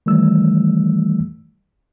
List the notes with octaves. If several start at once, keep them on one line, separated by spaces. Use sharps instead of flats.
D#3 E3 G3 A3 E6